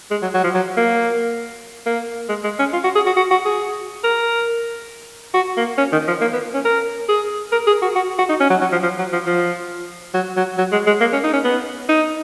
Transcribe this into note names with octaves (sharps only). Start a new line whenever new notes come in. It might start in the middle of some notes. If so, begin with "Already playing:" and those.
G#3
F#3
F#3
F3
F#3
A#3
A#3
G#3
G#3
C#4
F4
F#4
G#4
F#4
F#4
F#4
G#4
A#4
F#4
A#3
C#4
D#3
F3
A#3
B3
C#4
A#4
G#4
A#4
G#4
F#4
F#4
F#4
D#4
C#4
F#3
F#3
F3
F3
F#3
F3
F3
F#3
F#3
F#3
G#3
G#3
A#3
C#4
D#4
C#4
B3
D#4